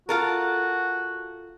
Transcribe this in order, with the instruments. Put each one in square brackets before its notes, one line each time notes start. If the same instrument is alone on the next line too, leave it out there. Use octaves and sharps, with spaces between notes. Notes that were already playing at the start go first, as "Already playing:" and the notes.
[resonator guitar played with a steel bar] F4 A4 A#4 [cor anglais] F#4